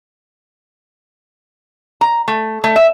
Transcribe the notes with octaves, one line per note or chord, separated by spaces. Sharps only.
A#5
A3
A3
E5